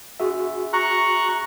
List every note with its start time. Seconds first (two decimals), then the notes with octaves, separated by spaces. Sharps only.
0.20 F#4 G#4 E5
0.73 A#5 C#6 F#6